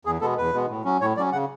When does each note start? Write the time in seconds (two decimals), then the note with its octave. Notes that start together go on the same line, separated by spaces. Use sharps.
0.05 E2 G#4
0.21 B2 G#3 B3 A4
0.38 E2 B4
0.54 B2 G#3 B3
0.69 A2
0.85 F#3 C#4
1.01 A2 C#5
1.17 F#3 C#4 D5
1.32 C#3 F#5